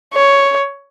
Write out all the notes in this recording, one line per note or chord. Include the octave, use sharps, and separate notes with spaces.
C#5